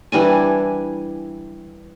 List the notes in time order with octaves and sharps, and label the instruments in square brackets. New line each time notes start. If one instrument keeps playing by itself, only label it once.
[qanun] E3 G3 D4 G#5